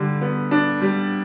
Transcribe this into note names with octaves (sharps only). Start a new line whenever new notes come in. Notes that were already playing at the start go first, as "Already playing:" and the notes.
Already playing: D3 G3
B3
D4
G3